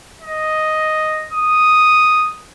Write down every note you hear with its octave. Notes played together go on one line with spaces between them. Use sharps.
D#5
D#6